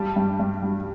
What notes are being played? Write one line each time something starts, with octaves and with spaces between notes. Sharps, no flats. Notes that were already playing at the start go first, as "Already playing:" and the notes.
Already playing: G2 G3 A5
G2
G2
G3